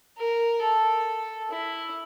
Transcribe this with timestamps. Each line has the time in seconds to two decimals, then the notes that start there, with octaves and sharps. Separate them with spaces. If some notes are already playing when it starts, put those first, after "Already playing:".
0.18 A#4
0.62 A4
1.51 E4